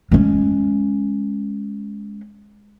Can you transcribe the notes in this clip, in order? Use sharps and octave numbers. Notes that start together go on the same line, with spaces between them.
G#3 C#4